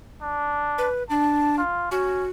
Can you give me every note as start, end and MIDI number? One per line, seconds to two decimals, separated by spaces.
0.22 0.88 62
0.78 1.03 71
1.10 1.61 62
1.10 1.57 81
1.58 1.87 65
1.91 2.25 61
1.91 2.29 66